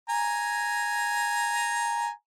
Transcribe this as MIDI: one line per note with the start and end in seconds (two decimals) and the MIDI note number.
0.09 2.10 80
0.09 2.10 82